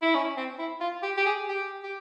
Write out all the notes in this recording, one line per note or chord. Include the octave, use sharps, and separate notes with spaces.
E4
C#4
C4
E4
F4
G4
G4
G#4
G4
G4